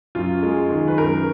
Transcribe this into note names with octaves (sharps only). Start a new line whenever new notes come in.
F#2 F4
G#3
D#3
B4
F#2 A#4